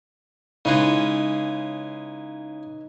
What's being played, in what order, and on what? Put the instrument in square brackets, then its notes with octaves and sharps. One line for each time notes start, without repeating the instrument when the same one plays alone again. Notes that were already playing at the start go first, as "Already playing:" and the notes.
[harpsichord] C#3 E3 G#3 [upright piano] D#4